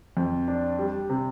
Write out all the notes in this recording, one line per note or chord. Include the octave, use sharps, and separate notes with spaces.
F2
D4
G3
C3